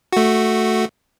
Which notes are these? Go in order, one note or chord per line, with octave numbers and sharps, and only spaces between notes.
A3 F#4